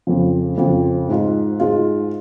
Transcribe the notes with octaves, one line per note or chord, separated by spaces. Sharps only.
F2 C#3 F3
F2 C#3 F3
G#2 G#3 F4
G#2 G#3 F4